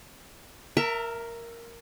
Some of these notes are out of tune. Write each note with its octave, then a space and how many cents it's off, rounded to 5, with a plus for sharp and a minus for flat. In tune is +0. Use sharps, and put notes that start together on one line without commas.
A#4 +0 E5 +10 A#5 -45